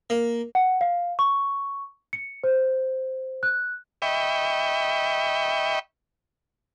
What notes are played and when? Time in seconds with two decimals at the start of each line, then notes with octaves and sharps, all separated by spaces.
0.10 A#3
0.55 F#5
0.81 F5
1.19 C#6
2.13 C#7
2.44 C5
3.43 F#6
4.02 D#5 E5 G5 B5 C#6